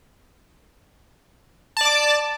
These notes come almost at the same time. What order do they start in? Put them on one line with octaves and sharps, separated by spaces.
A5 D5 D6